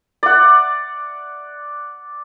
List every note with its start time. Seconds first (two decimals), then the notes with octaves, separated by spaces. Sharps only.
0.23 D5 F#5